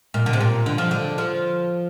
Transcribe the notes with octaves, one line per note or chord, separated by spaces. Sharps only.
A#2
D3
C3
A#2
D3
F3
D3
F3